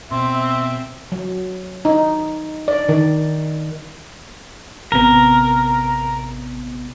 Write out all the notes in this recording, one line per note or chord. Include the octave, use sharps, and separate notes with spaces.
B2 C4 E5 C6
F#3
D#4
D5
D#3
A1 C3 B3 A#4